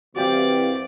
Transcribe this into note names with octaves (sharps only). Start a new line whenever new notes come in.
C2 C3 E3 F#4 G4 D5 F5